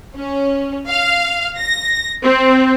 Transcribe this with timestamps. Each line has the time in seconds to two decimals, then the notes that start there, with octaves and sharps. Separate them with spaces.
0.15 C#4
0.88 F5
1.58 A#6
2.23 C4